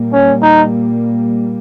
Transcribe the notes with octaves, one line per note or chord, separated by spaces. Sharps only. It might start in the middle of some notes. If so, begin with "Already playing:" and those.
Already playing: A#2 G3 A#3
C#4
D#4